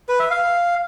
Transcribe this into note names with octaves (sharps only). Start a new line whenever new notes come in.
B4
E5
F5